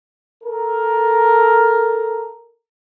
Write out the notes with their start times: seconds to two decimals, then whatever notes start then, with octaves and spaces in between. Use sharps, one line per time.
0.44 A4 A#4